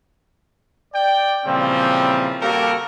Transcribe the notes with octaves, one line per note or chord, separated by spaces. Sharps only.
D5 G5
A#2 C#3 E3 F3 G3 C4
G3 A#3 F#4 G4 A4 A#4